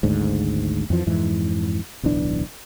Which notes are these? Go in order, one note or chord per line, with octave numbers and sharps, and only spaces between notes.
G#1 D2 G#2
F2 E3 F3
F2 G#2 E3
D1 B1 E3 D4